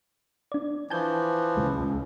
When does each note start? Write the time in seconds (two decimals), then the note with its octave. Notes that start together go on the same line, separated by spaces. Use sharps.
0.52 D4 D5
0.90 E3 F3 G#5 A5 G6
1.57 C#2 G#3